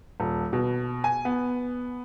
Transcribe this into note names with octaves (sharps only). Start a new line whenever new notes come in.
D#1
B2
G#5
B3